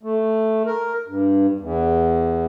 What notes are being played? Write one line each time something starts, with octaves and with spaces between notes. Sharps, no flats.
A3
A#4
G2
E2